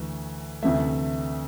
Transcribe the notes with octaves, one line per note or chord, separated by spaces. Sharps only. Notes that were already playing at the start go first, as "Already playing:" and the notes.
Already playing: D2 E3 A3
D2 C3 E3 A3 E5